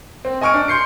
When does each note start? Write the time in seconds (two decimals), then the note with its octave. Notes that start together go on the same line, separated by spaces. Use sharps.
0.25 C4
0.41 D#5 G#5 C#6 F6 D7
0.54 D4
0.68 C6 G6 C7 C#7